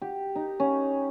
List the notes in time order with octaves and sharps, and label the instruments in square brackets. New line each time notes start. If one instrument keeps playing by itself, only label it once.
[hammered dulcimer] G4
D#4
C#4